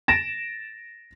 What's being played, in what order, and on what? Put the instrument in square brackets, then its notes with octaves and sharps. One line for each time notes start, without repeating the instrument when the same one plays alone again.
[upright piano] A6 A#6 D7 E7